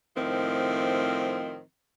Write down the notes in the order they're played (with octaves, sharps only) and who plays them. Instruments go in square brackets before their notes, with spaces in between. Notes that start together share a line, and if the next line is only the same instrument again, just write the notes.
[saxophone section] A2 D#3 F3 C4